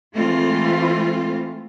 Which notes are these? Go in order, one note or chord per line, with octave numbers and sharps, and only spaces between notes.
E3 G#3 A3 C4 F4